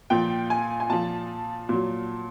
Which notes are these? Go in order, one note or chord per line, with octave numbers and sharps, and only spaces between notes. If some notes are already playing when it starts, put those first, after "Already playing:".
A#2 F3 G5
G#5
G#5
A#2 F3 A5
A#2 F#3